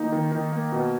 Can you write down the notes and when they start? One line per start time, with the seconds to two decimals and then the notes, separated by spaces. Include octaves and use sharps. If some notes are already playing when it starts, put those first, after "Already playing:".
Already playing: D#3 A#3 D#4
0.12 D#3
0.32 D#3
0.52 A#3
0.72 B2